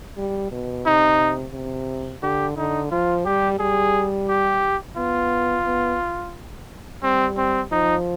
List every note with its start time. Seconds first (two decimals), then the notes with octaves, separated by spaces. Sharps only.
0.17 G3
0.51 B2
0.86 C3 D#4
1.54 C3
2.23 D3 G4
2.57 D3 D#4
2.91 F3 F4
3.25 G3 G4
3.59 G3 G#4
4.29 G4
4.97 B3 F4
5.66 B3
7.03 G3 C4
7.37 C4
7.72 F3 D#4